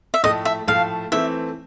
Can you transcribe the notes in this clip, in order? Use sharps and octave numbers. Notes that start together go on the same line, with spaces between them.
E5
A2 F3 A3 D#5
E5
A2 F3 A3 F5
E3 A3 C4 E5